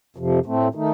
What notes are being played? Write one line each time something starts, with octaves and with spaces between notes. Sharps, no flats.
F2 C3 F3
A2 A3 C4
D#3 A3 D#4